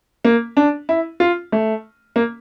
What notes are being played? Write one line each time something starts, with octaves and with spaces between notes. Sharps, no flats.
A#3
D4
E4
F4
A3
A#3